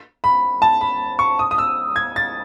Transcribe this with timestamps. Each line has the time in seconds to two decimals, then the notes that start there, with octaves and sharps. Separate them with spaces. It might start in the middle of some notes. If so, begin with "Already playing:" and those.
0.24 B5
0.62 A5
0.81 B5
1.19 C#6
1.39 D#6
1.51 D#6
1.58 E6
1.96 G#6
2.16 A6